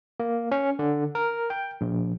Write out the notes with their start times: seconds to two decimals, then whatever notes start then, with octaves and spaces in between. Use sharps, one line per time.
0.20 A#3
0.52 C#4
0.79 D3
1.15 A#4
1.50 G5
1.81 A#1